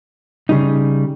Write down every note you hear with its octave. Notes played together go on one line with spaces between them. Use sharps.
C#3 G3 D#4